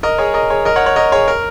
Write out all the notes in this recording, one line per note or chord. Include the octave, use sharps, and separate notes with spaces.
A#4 D#5
G#4 C#5
A#4 D#5
G#4 C#5
A#4 D#5
C#5 F#5
C#5 F#5
A#4 D#5
G#4 C#5
A#4